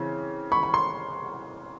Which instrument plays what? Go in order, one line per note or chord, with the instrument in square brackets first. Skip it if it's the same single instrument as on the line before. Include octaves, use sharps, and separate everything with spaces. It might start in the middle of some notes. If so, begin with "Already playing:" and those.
Already playing: [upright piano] C#3 E3 C4
B5 C#6
B5
C6